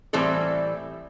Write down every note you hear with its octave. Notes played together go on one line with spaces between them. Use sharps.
A2 E3 G3 C4 A4